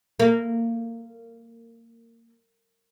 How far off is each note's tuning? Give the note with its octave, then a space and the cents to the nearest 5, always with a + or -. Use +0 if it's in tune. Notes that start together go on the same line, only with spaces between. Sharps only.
A#3 -20